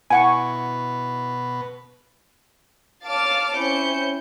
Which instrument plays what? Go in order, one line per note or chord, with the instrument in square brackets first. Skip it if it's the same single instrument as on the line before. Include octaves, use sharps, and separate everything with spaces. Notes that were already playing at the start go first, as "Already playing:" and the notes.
[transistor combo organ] B2 B4 [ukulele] E4 F#5 [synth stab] G#5 C#6
[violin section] C#5 F5 A5 D6 F6 A6
C4 C#4 E4 G6 C#7